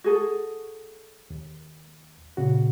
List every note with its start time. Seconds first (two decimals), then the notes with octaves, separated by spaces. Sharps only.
0.04 F#4 G#4 A4
1.30 D#2
2.37 A#2 C#3 F#4